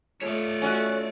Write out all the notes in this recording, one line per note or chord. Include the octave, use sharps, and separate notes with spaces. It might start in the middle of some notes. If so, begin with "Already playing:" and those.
A3 F4 C#5 D5
C#4 F#4